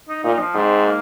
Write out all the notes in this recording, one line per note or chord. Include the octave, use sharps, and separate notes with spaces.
D#4
A#2 D#4
F3
G#2 C4
A#3